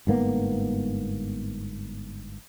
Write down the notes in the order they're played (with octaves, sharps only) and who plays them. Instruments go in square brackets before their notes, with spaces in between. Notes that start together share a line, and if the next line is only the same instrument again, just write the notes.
[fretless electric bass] G1 G#2 A#3 B3